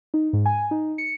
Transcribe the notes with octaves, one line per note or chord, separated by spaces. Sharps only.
D#4
G#2
G#5
D#4
C#7